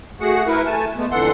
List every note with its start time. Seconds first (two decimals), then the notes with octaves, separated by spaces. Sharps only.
0.20 A3 F#4 G#4 F#5
0.47 E4 A#4 B4
0.66 A3 G#5 A5
0.97 G#3 A3 B3
1.11 F2 D3 E3 A4 F#5 C6